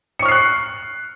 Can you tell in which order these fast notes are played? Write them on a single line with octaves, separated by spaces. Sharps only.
C#7 C#6 F6 C7 F#6